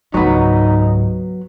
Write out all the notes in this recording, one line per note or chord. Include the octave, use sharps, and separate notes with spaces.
C#2 G#2 F#3 B3 D#4